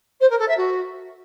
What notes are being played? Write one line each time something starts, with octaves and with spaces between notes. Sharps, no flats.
C5
A#4
A4
E5
F#4